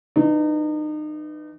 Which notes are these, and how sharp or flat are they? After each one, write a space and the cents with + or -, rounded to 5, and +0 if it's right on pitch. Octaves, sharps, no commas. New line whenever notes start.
E3 +0 D#4 -35